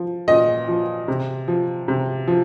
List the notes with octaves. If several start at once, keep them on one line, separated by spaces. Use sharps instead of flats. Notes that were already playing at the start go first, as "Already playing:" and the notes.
Already playing: F3
A#2 D#5
F3
C3
F3
C3
F3